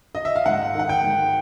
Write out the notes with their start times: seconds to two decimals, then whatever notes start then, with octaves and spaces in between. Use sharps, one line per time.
0.15 D#5
0.25 E5
0.35 F5
0.46 G#2 F#5
0.75 D#3 F#5
0.89 G5
1.04 G#2